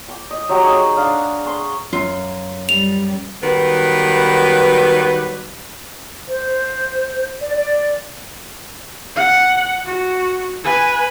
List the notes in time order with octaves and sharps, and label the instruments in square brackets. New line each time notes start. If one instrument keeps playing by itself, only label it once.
[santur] G5 D6
D#5
F#3 G4 C#5 A#5
D#4 G#4 D#5
D4 F5 F#5
C6 C#6
[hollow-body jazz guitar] F#2 [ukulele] F4
[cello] G3 [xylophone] F7
[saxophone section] D#3 F#3 G3 B3 B4
[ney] C5
D5
D5
[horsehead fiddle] F#5
F#4
B4 G#5